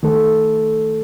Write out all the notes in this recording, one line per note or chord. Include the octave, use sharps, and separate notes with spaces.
D#3 A3 A4